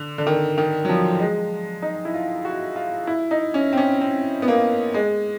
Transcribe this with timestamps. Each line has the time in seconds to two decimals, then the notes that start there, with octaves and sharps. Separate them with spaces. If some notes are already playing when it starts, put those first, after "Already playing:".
Already playing: D3
0.18 D3
0.27 D#3
0.58 D#3
0.85 F#3
0.89 F3
1.20 G#3
1.82 D#4
2.05 E4
2.14 F4
2.45 F#4
2.76 F4
3.07 E4
3.31 D#4
3.54 C#4
3.73 C4
3.77 C#4
4.01 C4
4.42 B3
4.48 A#3
4.94 G#3